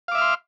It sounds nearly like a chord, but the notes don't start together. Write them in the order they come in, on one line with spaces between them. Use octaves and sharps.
F5 D6 E5 F6 C6